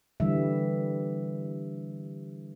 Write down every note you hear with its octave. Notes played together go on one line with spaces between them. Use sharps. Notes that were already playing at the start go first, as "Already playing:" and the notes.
D3 E3 G3 E5